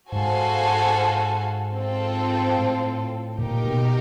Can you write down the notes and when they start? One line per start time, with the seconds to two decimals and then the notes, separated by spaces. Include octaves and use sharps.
0.12 G#2 F#4 A4 C5 F5 G#5
1.75 C4 F4 A4
2.56 A2
3.38 A#2 D#4 G4 A#4
3.65 B2